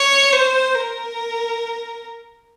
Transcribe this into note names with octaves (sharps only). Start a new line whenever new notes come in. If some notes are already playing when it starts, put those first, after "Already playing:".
Already playing: C#5
C5
A#4